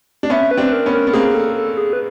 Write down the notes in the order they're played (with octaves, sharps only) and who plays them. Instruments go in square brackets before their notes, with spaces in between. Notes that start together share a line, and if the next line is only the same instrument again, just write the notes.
[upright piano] D4
[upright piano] B3 C#4 [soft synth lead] E5
[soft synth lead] B4
[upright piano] C4 D4
[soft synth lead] A#4
[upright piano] B3 C#4
[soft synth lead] A#4
[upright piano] B3
[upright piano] A#3 C4 [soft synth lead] G#4
[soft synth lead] A4
A4
G#4
B4